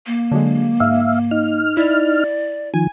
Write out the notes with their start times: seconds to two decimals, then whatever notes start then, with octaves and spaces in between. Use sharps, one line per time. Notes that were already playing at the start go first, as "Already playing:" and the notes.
0.06 A#3
0.31 D3 F#3 G#3
0.80 G#2 E5 F5
1.31 D#4 F6
1.77 E4 D5
2.74 D#3 F3 G#5